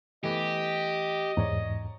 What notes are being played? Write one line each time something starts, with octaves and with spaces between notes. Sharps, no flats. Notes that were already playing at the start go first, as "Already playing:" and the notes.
E3 A3 B3 G4 D#5
E2 G#2 C#5 D5 A#5